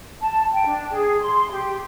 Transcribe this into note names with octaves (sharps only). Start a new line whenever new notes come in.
A5
G5
D4
G#4
C6
G4